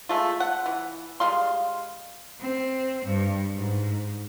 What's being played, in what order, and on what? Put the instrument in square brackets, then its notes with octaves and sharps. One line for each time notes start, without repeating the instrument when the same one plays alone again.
[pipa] G#3 A3 F4
F#5
E3
G3 G#3 F5 C6
[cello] C4
G2
G#2